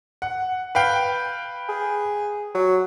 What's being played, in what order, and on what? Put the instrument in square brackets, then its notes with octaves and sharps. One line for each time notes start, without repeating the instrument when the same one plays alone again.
[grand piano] F#5
B4 F5 G5
[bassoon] G#4
F#3